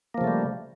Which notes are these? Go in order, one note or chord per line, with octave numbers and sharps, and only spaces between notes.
C#3 F3 G3 A3 A#3